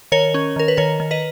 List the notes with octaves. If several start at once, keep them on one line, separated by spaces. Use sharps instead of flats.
D#3 A#4 C#5
C#4
D#3 A#4
B4
D#3 A#4 C#5
D#3
B4 D#5